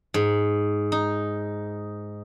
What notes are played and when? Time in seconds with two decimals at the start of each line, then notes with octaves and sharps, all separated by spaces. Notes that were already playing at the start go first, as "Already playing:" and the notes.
0.14 G#2
0.92 D#4